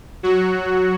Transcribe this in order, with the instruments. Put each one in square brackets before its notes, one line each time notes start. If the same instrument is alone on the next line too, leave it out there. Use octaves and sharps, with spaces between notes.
[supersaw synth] F#3 F#4